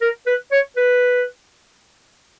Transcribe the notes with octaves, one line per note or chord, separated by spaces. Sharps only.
A#4
B4
C#5
B4